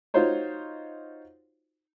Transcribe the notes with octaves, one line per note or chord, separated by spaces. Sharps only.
D#4 F4 F#4 C5 C#5